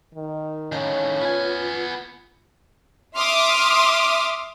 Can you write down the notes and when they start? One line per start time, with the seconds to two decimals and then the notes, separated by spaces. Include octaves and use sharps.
0.15 D#3
0.72 A2 D#3 C#4 F5 A5 A#5
1.21 B3 F4 B4 G#5
3.17 E5 C6 D6 D#6 F6